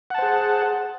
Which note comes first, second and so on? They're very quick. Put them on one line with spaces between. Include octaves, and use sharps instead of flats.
F#5 A5 C5 G#4